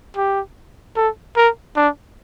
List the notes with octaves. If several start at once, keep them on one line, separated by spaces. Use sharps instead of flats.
G4
A4
A#4
D4